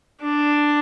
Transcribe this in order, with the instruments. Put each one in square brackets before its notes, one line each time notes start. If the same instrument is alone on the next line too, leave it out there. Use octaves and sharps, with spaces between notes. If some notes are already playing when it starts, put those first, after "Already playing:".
[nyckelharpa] D4